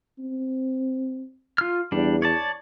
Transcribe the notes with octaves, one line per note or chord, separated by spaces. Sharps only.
C4
F4 F6
E2 G3 D4
C#5 D5 A5